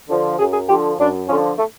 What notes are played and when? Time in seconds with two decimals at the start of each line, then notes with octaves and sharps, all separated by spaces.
0.09 D3 F3
0.39 F#2 G#4
0.53 G#4
0.68 D3 F3 G4
0.99 F#2 D4
1.28 D3 F3 C#4
1.58 A3